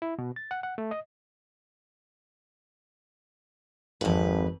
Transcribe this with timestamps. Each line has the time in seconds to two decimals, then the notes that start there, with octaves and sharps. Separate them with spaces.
0.02 E4
0.19 B2
0.36 A6
0.51 F#5
0.63 F#5
0.78 A3
0.91 D#5
4.01 G#1 F2 B4